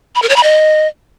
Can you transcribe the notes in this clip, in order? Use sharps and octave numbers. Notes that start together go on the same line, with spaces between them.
B5
A#4
C#5
B5
D#5